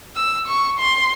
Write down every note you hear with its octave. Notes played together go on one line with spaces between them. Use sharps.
E6
C#6
C6